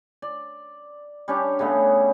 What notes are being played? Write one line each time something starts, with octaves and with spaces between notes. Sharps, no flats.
D5
G3 C#4 D4 G4
C#3 G3 A3 B3